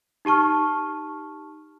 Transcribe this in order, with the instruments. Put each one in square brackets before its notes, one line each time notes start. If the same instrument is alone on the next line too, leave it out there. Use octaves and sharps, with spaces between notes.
[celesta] D#4 G4 A5 C#6 F6